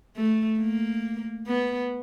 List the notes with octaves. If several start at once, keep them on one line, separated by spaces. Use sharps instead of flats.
A3
A#3
B3